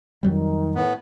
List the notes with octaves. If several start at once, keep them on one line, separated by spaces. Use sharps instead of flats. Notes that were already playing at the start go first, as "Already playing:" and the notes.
F2 D#3 F#3 G3
A2 B3